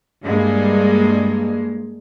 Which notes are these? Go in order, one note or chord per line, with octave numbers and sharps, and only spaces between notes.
G2 G#3 A#3